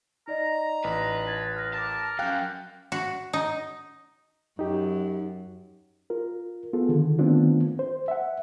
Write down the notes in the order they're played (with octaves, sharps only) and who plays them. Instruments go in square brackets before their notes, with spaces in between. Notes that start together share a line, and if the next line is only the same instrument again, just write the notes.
[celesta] D#4 D5 D#5 [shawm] A#5
[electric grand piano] A1 [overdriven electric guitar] B4
[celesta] A5 G#6 A6
F6 A#6
[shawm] A#4 [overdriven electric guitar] A5 [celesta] D6 A6
[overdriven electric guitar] F#3 C#4 [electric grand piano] F5 G5 F#6
[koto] F#4
D#4
[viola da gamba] F#2 [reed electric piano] D#4 G4
[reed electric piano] F4 A#4
B3 F4 G#4 A4
D3 D#3
D#3 A3 B3 C4 D4 F4
C5
E5 F#5